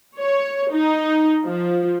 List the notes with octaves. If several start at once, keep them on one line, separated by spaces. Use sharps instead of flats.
C#5
D#4
F3